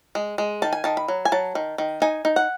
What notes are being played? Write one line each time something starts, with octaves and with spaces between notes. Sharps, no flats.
G#3
G#3
D#3 A5
G#5
D#3 A5
B5
F#3
G#5
F#3 A5
D#3
D#3
D#4 G#5
D#4
F#5